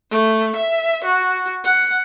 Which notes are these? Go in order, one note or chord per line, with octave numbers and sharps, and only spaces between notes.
A3
E5
F#4
F#5